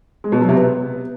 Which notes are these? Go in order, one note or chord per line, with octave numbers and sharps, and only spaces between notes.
G#3
B2
F#3
C3
B3